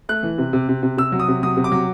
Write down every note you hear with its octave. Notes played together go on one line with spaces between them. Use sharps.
A3 F#6
E3
C3
C3
C3
C3
C3 E6
F#3
D#6
C3
F#3 D#6
C3
D6
F#3